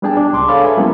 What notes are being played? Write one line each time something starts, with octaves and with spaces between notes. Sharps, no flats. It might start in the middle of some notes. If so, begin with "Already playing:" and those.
G3 B3 D4 G#4 G5 A5
D4
C#2 C6 D6
G#4 A4 C#5 F5 A5 B5
G#4 A4 B4 E5 B5
F#3 G3 A#3 B3 C#4 E4